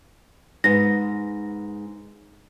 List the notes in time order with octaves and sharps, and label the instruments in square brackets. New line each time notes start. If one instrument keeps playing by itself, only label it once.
[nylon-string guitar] G#2 B3 [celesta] A#6